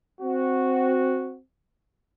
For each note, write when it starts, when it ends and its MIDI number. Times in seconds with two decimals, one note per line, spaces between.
0.21 1.38 60
0.21 1.38 66